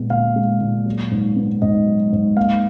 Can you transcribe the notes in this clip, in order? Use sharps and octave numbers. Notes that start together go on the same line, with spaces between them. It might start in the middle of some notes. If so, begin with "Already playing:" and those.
Already playing: A#2 G#3 B3
A#2 F5
G#3
A#2
F#3
G#2
B3
G#2 D#5
F#3
G#2
A#3 F5